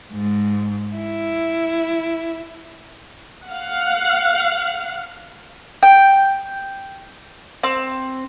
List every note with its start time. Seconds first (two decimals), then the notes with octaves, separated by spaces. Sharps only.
0.13 G#2
0.95 E4
3.45 F5 F#5
5.83 G5
7.63 C4